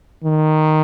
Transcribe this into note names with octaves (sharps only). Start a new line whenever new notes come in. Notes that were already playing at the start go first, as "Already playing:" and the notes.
D#3